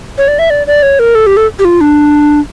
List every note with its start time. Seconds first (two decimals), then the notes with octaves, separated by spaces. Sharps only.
0.18 C#5
0.28 D5
0.39 E5
0.50 D5
0.67 D5
0.83 C#5
0.99 A#4
1.15 A4
1.26 G4
1.37 A4
1.59 G4
1.65 F4
1.81 D4